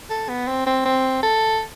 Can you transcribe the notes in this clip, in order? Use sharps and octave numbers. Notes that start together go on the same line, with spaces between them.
A4
B3
C4
C4
C4
A4